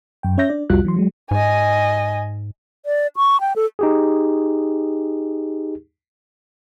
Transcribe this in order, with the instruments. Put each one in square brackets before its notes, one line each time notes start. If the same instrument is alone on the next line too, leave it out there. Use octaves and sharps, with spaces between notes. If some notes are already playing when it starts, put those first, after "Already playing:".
[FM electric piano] F#2 G5
C#4 C#5 E5 G6 A#6
D4 D5
C2 F2 G3 F4 F#4 F#6
E3 F#3 C6
F#3 G#3
[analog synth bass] G#2 [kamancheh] D#5 G#5
[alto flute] D5
C#6
G5
A4
[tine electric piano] D#4 G4 G#4